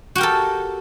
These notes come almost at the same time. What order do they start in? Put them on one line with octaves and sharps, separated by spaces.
F#4 G4 A#4 A4